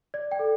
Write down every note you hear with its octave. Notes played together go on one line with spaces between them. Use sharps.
D5
G5
A4